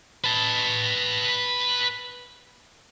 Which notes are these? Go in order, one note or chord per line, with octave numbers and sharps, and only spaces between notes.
B4 A5